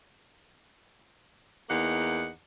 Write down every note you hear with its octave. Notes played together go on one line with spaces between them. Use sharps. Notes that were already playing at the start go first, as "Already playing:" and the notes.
E2 A#3 D#4 F#5